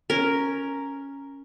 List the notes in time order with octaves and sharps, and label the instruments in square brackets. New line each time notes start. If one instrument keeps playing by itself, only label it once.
[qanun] C#4 A#4